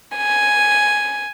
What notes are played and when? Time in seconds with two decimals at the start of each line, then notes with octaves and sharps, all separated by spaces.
0.16 G#5